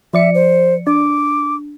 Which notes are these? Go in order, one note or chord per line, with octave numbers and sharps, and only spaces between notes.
F3 D5 E5 C#7
C5
D4 D6